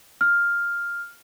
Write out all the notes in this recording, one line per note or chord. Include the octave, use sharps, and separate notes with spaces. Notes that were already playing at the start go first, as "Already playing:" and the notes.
F6